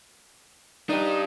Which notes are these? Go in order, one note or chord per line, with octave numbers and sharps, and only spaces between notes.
D4 D#4 G4